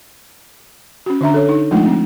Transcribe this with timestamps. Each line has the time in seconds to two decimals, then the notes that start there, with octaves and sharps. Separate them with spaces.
1.06 C#4 F#4
1.21 D3 D4 E5 A#5
1.34 A4 C#5
1.49 D#4
1.71 F3 G#3 A3 D4 D#4 F4
1.86 C4